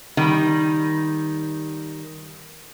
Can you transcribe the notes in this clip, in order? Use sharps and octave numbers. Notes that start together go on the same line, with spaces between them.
D#3 G3